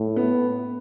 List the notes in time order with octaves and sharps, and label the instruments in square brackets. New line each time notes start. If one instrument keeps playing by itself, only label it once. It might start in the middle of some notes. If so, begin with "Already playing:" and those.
Already playing: [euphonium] A2
[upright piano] B3